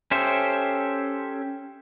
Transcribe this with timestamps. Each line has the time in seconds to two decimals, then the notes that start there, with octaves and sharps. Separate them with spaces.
0.11 C#4 G4 A4 C5 E5